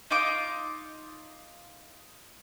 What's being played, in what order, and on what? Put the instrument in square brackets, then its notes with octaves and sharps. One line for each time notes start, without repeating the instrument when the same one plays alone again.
[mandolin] D#4 F4 D6